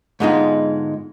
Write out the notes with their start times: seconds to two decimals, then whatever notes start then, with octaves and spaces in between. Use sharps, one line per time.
0.20 G#2 D3 G#3 B3 D#4 F4